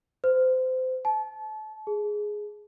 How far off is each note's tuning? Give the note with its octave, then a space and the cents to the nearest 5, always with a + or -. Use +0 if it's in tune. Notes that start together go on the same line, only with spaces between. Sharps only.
C5 -25
A5 -30
G#4 +5